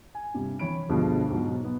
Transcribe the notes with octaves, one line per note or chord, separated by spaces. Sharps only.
G#5
G2 C3 G3
E3 C#5 B5 D7
D2 G2 B2 F3 G#3
G#2 B2 F#3
B3